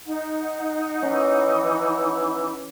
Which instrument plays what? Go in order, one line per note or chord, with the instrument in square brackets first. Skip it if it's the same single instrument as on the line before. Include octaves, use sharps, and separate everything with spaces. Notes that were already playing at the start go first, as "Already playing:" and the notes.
[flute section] D#4 F#5
[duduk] E3 [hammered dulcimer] C#4